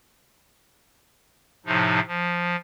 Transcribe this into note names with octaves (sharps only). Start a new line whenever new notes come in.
A2 C3 F3 D#4
F3